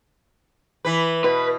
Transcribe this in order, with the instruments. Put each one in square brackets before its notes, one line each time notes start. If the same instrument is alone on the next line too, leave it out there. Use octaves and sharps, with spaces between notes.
[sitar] E3 B4
[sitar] B2 [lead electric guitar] B4